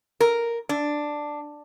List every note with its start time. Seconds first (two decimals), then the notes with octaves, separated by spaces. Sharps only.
0.20 A#4
0.69 D4